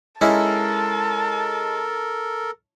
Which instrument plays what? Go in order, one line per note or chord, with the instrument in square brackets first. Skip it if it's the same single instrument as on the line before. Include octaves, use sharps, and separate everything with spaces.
[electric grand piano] G#3 [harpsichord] C#4 D#4 E4 [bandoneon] A4 A#4 [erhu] A5